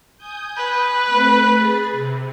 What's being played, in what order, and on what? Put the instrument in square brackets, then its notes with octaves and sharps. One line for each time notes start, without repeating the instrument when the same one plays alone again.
[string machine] G#5 D#6 G6
[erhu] B4
[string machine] A3 C4
G#4 A6
C3